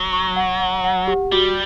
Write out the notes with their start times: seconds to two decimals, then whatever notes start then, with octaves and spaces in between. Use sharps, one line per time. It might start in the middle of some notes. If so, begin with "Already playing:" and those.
Already playing: F#3
0.13 C#6
0.36 F#5
0.60 F#5
0.84 F#5
1.08 G4
1.32 G3 F#4